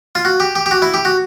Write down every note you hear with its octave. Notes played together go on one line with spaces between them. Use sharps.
F4
F#4
G4
G4
G4
F#4
E4
G4
F#4